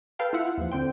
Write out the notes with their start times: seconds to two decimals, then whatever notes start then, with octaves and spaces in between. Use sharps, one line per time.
0.19 A4 B4 F5 G5
0.33 E4 F4 E5 F#5
0.58 D#2 F3
0.72 D3 C4 C5 G5